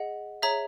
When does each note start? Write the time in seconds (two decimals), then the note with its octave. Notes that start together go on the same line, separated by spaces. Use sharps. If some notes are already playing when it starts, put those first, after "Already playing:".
Already playing: G#4 D#5 F#5
0.42 G#4 C#5 E5 A#5